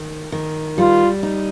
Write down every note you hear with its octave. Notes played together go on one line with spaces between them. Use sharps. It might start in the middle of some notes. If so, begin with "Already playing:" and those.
Already playing: D#3
D#3
G3 F4
D#4